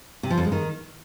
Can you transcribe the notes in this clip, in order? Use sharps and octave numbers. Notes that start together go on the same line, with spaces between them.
C3
F3
F2
G#3
D#3